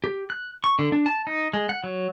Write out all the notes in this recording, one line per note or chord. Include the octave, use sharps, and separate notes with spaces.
G4
F#6
C#6
D3
D4
A5
D#4
G#3
F#5
F#3